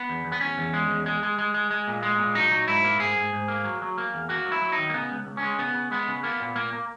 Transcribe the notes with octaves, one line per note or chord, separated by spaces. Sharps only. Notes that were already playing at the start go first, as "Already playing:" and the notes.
Already playing: B3
E2
E2
B3
E2 C#4
E2
G#3
E2
G#3
G#3
G#3
G#3
G#3
A#2
G#3
A#2
F#3 D#4
F#3
G#2 E4
A#3
G#2 G#4
G#2
G#2
A#3
F#3
F#3
A#3
E2
A#3 F#4
F#3
E4
F#3
D#4
D#3
A#3
C#3 B3
C#2
C#2
C#4
G#3
C#3 B3
C#3
G#3 B3
C#3
A#3 B3
A#2
A#2 A#3
A#3